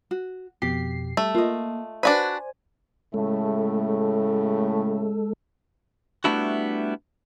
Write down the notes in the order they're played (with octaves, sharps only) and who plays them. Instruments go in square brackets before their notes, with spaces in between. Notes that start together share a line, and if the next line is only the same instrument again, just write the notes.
[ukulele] F#4
[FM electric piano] F2 B2 C7 [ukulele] G4
[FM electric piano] G3 [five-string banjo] A3
[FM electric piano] A#3 [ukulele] F4 D#5
[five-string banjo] D4 F#4 B4 [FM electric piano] C5 D5 G#5
[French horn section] A2 C#3 A3 [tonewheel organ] G#3 A4
[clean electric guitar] G3 A3 B3 D4 E4 F#4